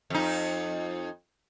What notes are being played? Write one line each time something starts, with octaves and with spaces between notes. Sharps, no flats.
F2 D#4